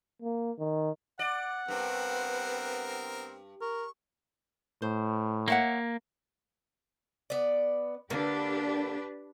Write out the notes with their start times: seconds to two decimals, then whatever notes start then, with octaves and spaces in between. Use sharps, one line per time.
0.22 A#3
0.59 D#3
1.19 D5 F#5
1.68 G2 B3 C4 A#4 B4
3.61 A#4 C#6
4.82 A2 C5
5.48 A#3 C#5 E5 F#5
7.30 B3 D5
8.10 D3 A#3 D4 G4 B4